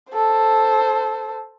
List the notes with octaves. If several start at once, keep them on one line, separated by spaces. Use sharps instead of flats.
A4 C5